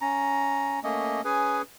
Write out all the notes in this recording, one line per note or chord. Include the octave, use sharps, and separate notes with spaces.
C#4 A#5
A3 A#3 C#4 D#5
C#4 G#4 B4 G#5